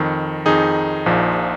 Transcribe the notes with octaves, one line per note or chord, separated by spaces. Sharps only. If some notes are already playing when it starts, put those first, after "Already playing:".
Already playing: F2 D#3
F2 D#3 D#4 G#4
A#1 A#2 F3